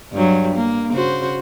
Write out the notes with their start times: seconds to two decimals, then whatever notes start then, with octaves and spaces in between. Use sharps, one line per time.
0.13 G2 F#3
0.56 A#3
0.91 C#3 F#4 C5